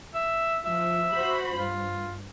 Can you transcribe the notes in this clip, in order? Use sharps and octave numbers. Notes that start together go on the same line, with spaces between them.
E5
F3 E5
F#4 C5 B5
G2 F4